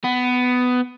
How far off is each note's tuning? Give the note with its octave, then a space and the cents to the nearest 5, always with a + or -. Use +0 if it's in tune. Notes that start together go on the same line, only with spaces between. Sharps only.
B3 +15